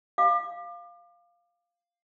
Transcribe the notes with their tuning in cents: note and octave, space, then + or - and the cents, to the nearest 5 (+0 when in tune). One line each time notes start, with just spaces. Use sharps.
F5 +0 D6 +35